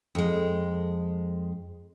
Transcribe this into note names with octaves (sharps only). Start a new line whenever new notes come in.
F2 G#3